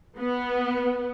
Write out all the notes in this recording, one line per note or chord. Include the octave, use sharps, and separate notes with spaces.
B3